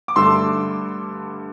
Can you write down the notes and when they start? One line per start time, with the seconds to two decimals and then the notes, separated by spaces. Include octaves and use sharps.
0.08 D6
0.16 G2 D3 A3 C6 E6